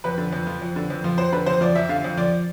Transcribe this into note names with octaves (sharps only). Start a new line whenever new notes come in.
F2 B4
D3
F2
F3
F2
D3
F2
F3
F2 C5
D3 B4
F2 C5
F3 D5
F2 E5
D3 F5
F2
F3 D5